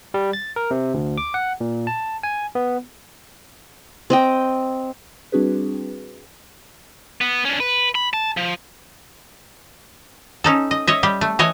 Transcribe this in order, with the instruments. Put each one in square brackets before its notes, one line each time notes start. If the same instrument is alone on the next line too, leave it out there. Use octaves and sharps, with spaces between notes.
[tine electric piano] G3
A6
A#4
C3
D2
D6
F#5
A#2
A5
G#5
B3
[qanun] C4 D#5 G5
[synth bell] G3 C4 D4 F#4 G#4 B4
[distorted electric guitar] B3
C#4 D4
B4
B5
A5
F3
[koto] C#4 D#4 A4
D#5
C#5 D#5 E5
G3 G4
A3
E3 C#5 D#5 G#5